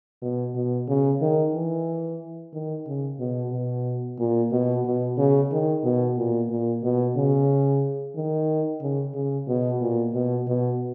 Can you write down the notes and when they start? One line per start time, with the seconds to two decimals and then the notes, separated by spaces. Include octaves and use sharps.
0.22 B2
0.55 B2
0.88 C#3
1.21 D#3
1.54 E3
2.53 D#3
2.86 C#3
3.19 B2
3.52 B2
4.19 A#2
4.51 B2
4.85 B2
5.18 C#3
5.51 D#3
5.84 B2
6.17 A#2
6.50 A#2
6.83 B2
7.16 C#3
8.15 D#3
8.81 C#3
9.15 C#3
9.47 B2
9.81 A#2
10.14 B2
10.47 B2